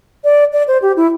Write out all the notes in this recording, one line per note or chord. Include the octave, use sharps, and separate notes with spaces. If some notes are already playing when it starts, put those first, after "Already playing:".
D5
D5
C5
G4
E4